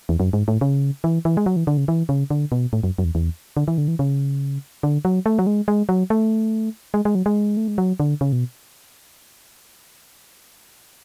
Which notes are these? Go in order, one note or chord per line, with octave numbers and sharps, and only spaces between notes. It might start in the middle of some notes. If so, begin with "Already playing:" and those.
E2
F#2
G#2
A2
C#3
E3
E3
G#3
F#3
E3
D3
C#3
E3
C#3
D3
B2
A2
F#2
F#2
E2
E2
D3
E3
D3
E3
C#3
D3
F#3
A3
F#3
G#3
G#3
F#3
A3
G#3
G#3
F#3
G#3
A3
G#3
F#3
D3
C#3
B2